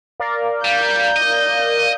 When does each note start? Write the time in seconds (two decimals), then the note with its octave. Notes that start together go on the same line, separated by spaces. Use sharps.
0.20 A#4 D5 F5
0.65 G3 G6
1.16 D#5